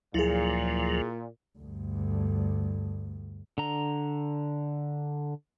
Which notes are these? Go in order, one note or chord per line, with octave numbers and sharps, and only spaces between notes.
D2 A#2 F3 F#3 E4 G#4
D2 G2
D3 A#5